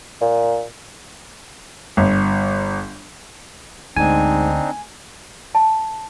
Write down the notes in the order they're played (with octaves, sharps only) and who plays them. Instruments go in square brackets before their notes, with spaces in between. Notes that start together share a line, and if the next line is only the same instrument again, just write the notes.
[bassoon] A#2
[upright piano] G1
[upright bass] D2 [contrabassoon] G#2 [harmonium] C4 D4 D#4 [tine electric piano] G#5
[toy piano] A5